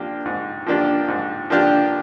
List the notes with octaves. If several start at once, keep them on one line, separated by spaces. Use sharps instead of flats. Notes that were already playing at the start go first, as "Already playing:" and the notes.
Already playing: F3 A#3 D4 G4
G#2
F3 A#3 D4 G4
G#2
F3 A#3 D4 G4